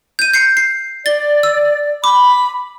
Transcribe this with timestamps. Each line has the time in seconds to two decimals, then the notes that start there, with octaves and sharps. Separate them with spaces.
0.19 G6 D#7
0.33 G6 C7 C#7
0.57 C7
1.06 D5 A6 G7
1.43 E6
2.04 B5 D6